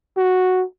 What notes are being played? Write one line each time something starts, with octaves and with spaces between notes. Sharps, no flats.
F#4